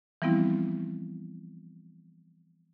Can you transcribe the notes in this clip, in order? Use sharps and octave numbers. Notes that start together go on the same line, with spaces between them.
E3 F3 G3 B3 C4 E4